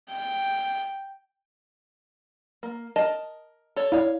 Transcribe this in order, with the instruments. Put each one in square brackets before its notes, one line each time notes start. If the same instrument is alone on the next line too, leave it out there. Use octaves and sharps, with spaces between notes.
[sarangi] G5
[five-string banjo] A#3
A#4 D#5 A5
A4 C#5
[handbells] E4 D5 [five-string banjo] C#5 F5